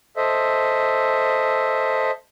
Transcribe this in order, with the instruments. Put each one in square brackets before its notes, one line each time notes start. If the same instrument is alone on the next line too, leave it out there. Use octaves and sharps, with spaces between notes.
[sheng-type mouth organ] A4 C5 D#5 E5